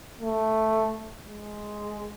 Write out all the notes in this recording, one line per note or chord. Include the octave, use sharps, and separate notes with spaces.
A3
G#3